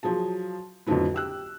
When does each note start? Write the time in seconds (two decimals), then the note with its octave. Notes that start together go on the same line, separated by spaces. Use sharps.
0.03 F3 F#3 G#4 A5
0.87 F2 A2 D3 F3 F#3 B3
1.14 G4 E6 F#6